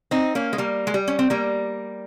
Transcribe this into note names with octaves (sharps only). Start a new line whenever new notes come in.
C4 D#4
A#3 C#4
G#3
G3 A#3
G#3
G3
C#4
C4
G3 A#3